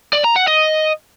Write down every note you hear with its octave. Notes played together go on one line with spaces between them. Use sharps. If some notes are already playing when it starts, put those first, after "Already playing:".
D5
A#5
F#5
D#5